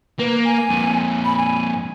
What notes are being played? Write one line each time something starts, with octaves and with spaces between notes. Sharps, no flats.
A#3 B4
G#5
F2 A#2
B5
G#5